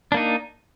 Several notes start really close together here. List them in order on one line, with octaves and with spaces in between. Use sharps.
D4 A#3 D#4